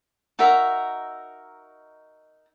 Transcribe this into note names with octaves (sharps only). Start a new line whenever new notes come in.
D#4 F#4 A#4 E5